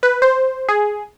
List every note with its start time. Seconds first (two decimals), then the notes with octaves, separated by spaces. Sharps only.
0.03 B4
0.22 C5
0.68 G#4